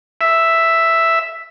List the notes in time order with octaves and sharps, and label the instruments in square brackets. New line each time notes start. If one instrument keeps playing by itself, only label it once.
[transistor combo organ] E5